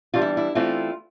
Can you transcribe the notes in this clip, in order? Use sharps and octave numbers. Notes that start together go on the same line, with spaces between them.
E3 G3 D4 F4
E4
E4
E3 A3 C4 E4 F4